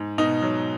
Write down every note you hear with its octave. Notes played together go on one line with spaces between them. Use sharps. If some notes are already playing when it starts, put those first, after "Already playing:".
Already playing: G#2
B2 D#4
F#3